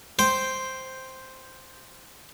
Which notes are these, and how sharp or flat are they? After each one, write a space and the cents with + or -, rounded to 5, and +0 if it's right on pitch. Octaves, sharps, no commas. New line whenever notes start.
C5 +0 G5 +0